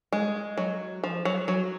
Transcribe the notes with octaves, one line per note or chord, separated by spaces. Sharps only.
G#3
F#3
F3
F#3
F#3